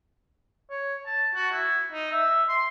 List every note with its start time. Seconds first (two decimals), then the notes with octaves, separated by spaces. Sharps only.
0.70 C#5
1.06 A5
1.34 F#4
1.52 E4
1.92 D#4
2.12 E5
2.49 C6